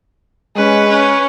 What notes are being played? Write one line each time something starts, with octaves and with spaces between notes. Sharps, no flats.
G#3 C#4 B4
C#4